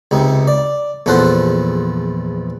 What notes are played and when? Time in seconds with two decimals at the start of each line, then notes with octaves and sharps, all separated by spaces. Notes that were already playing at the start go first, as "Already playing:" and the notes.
0.11 C#2 C3 D#4
0.48 D5
1.06 A#1 E2 F3 A4 C5 F#5